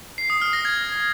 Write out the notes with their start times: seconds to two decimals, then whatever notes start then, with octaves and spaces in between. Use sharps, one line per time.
0.18 C7
0.30 D#6
0.41 F6
0.53 A#6
0.65 G#6